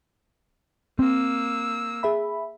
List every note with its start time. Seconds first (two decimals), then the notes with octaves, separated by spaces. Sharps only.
0.99 A#3 C4 E6
2.03 G#4 E5 B5